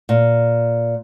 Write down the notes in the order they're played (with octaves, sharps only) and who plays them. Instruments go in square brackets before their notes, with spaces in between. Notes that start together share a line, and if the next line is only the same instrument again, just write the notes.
[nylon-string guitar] A#2